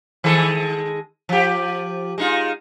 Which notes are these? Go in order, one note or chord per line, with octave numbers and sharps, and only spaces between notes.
D#3 G#3 A4
F3 G4
G#3 D#4 F4